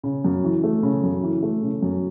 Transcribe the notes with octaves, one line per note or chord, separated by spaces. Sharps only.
C#3
F#2
E3
A3
C#3
F#2
E3
A3
C#3
F#2